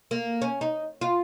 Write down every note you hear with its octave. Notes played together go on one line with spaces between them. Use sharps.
A#3
C#4
D#4
F4